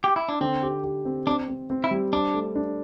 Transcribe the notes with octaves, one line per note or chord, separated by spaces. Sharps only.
G4
E4
D4
D3 C4
G4
G4
C4
C4 D4
C4
C4
E4
G3
D4 C5
A3
D4